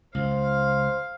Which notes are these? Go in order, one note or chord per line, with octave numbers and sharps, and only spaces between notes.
C#2 C5 F5